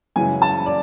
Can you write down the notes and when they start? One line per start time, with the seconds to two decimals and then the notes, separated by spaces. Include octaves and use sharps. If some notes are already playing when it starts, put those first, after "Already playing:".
0.16 F#2 C#3 E3 G#3 G#5
0.42 A5
0.66 D5